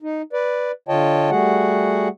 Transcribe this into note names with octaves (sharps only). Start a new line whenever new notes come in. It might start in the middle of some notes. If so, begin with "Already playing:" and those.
D#4
B4 D5
D3 F4 C#5 D#5 G5 A5
G3 A3 F#4 G#4 F#5